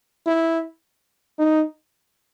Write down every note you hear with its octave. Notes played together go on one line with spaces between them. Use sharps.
E4
D#4